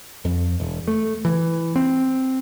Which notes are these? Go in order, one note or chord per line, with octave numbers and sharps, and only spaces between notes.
F2
E1
A3
E3
C4